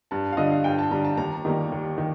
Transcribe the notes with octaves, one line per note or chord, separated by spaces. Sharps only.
G2 A5
F5
D3 G3 D#5
F5
G2 G5
A5
D3 G3 A#5
A5
D#2 A#5
D#3 G3 A#3
D#2
D#3